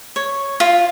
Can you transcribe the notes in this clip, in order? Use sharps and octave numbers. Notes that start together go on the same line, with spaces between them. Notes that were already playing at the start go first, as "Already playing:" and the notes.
C#5
F4